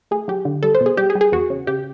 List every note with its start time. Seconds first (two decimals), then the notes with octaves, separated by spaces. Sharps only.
0.11 A3 G#4
0.28 F#3 G4
0.45 D3
0.63 G3 A4
0.75 C5
0.81 B2
0.86 G#4
0.97 G3 G4
1.10 G#4
1.15 G3
1.21 G#4
1.32 E2 F#4
1.50 C#3
1.67 C#3 G4